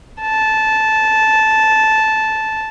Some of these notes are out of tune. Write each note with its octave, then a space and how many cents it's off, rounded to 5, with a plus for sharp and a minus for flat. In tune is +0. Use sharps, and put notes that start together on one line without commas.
A5 -10